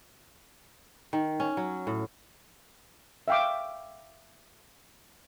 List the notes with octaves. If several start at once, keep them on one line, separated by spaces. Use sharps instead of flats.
D#3
C#4
F#3
A2
E5 F5 G5 C#6 D6